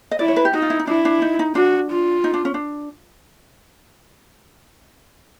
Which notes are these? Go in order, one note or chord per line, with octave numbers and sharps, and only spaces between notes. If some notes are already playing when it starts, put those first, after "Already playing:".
D#5
E4 D5
C#5
B4
G4
D#4 F#4
F4
E4
D#4
D4 E4
D4
D#4
D#4
D4 F#4
F4
D#4
D4
C#4
D4